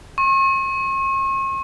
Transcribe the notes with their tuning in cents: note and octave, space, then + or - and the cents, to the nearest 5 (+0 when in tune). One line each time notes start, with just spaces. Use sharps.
C#6 -45